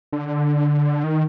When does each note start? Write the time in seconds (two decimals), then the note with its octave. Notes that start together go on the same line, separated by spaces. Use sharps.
0.12 D3
1.04 D#3